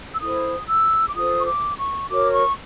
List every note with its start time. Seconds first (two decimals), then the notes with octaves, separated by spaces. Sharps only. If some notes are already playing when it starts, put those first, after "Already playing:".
0.13 E6
0.20 E4 A4 C5 D#6
0.67 E6
1.07 D6
1.15 F4 A4 C5 D#6
1.38 C#6
1.46 D6
1.78 C#6
2.10 F#4 A#4 C#5 D6
2.33 C#6